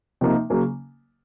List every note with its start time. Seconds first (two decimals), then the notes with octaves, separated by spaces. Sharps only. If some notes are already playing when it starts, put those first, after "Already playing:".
0.21 C3 F3 A#3 D#4
0.50 C#3 F#3 A#3 C#4